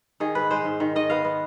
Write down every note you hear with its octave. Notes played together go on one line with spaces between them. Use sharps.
D#3 G#4
G#2 B4
G#3 C5
G#2
D#3
D#3 D#5
B3 F5
B3